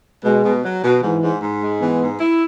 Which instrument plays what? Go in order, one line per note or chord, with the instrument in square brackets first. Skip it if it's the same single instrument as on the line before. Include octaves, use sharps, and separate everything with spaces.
[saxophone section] B2 [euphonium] G#3
[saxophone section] B2
F#3
B2
[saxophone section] G#2 [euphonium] E3
[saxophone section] G#2
G#2
G#3
[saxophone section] E3 [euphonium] B3
[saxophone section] G#2
E4